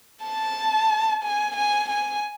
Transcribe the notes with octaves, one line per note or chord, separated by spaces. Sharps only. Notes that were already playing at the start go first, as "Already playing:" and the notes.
A5
G#5
G#5
G#5